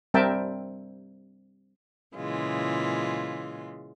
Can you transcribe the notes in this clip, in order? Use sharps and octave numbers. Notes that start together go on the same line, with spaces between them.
G3 C4 A#4 E5 G5 A5
A#2 C#3 E3 G#3 F4